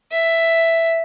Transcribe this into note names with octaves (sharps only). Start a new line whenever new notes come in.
E5